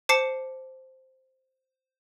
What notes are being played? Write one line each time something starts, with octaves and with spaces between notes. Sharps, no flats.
C5 A5 D6 C7 C#7